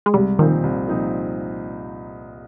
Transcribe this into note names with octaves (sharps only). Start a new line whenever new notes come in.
G#3
C2 G3
A#2 D#3 F3 C4 D#4
C2
A#2 F3 C4 D#4